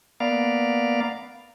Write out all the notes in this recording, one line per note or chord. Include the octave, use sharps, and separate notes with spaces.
A#3 B3 D5 F5